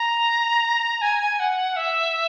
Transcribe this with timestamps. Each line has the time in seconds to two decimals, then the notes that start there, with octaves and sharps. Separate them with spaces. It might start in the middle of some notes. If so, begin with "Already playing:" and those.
Already playing: A#5
1.01 G#5
1.40 F#5
1.76 E5